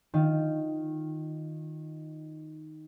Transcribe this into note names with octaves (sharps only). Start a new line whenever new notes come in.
D#3 F4